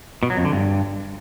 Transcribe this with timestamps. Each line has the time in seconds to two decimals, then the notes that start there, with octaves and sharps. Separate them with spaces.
0.23 B2
0.30 F#3
0.38 F2
0.45 D3
0.52 G2